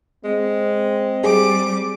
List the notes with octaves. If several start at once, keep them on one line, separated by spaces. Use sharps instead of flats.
G#3 C4
G3 G#4 D6